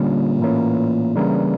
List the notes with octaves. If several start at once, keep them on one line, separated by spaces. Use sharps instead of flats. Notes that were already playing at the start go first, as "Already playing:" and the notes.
Already playing: A#2 D3 G3 C#4
A2 E3 A#3 C#4
C#3 E3 G3 A#3 D4